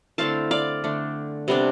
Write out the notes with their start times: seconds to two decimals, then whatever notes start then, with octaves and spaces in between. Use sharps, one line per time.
0.18 D3 A3 C4 E4 F5 A5
0.51 D5 F5
0.84 D3 A3 D4
1.48 C3 G3 B3 D4